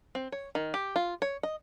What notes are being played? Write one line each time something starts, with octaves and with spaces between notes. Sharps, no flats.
C4
C#5
D#3
G4
F4
C#5
D#5